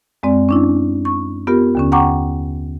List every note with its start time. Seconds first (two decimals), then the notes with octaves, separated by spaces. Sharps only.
0.23 F#2 G#3 C4 D5
0.49 C#4 D4 E4
1.05 C#6
1.47 B3 F4 G4 A#4
1.75 D#2 D3 C#4
1.92 F#5 G5 A#5 C#6 D6